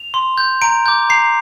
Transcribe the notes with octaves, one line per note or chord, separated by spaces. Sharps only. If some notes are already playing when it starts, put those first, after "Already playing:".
Already playing: F7
C6
G6
A#5 D7
D6 G6
A#5 C7